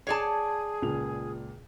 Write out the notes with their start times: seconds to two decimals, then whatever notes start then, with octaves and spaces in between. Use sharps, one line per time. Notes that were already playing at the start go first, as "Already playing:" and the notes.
0.07 G#4 C#5 D5 A5 C7
0.82 C#2 A#2 F7